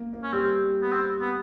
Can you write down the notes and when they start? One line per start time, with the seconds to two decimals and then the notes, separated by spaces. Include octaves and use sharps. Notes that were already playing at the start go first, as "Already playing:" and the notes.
Already playing: A#3
0.13 A#3
0.23 C#4
0.33 G3 C4
0.82 B3
0.92 C4
1.21 B3